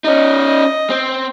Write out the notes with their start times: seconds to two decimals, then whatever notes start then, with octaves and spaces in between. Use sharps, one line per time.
0.04 C#4 D#4 D#5
0.90 C4